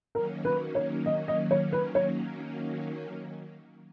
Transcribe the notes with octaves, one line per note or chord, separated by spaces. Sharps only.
D#3 F#3 A#3 C#4 A#4
B4
C#5
D#5
D#5
C#5
B4
C#5